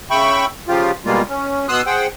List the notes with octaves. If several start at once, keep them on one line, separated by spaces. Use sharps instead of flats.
C#3 E5 G5 B5 C#6
C#3 F3 F4 G4
B2 G3 G#3 A#3 F4
C#4
B2 B3 C6 D#6 E6 F#6
G#4 C5 F#5 G5